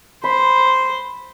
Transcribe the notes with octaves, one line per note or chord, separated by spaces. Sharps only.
C5 B5